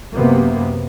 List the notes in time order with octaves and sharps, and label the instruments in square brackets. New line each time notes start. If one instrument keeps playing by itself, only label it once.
[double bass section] F#2 C3 A#3 B3